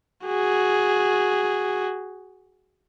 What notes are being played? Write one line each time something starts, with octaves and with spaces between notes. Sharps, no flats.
F#4 G#4